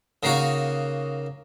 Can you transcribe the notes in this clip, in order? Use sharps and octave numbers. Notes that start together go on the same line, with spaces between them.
C#3 A#3 D#4 F#4 C#5